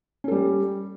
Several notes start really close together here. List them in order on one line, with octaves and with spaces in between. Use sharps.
C#4 A4 G3